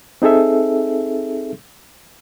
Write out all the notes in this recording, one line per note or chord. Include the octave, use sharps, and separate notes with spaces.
C4 D#4 G#4 A4 E5